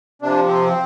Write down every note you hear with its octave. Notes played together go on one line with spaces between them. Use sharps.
C3 F3 D4
C4